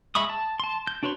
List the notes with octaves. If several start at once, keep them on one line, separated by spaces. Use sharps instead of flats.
G#3 E5 B5 C#6 D#6
A5
A5 C6
G6
D4 F#4 B4 C#5 C6